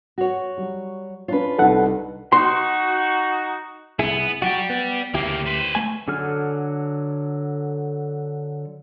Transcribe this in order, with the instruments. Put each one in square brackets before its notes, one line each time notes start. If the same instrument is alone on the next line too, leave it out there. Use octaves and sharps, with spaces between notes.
[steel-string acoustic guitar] F#4 C#5
[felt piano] F#3 G3
[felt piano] C#4 D4 C#5 [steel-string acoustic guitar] F4 B4
[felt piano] C2 D4 D#4 [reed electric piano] A4 F#5
[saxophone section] D#4 F#4 [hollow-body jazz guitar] C6
[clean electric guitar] C2 E4 G#4 [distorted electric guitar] B3
[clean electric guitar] F#3 F#4 [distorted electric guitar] D5 G5
[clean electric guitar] B3
[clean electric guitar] D2 E4 G4 [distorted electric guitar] C#3 A#3
[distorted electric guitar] B4 C5
[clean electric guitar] A3 G#5
[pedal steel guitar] D3 F#3 A4 G#5 F6